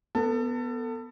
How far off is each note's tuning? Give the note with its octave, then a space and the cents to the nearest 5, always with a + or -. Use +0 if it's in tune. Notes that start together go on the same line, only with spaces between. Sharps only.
B3 +0 A4 +30